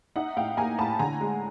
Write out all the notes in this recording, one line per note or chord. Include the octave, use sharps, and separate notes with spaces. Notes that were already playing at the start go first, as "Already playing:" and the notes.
D#4 E5 F#5
A2 F5 G5
A#3 G#5 A#5
A2 A5 B5
D3 G#5 A#5
G#3